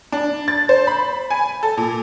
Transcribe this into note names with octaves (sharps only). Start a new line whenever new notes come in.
D4
A6
C5
B5
G#5
A4
A#2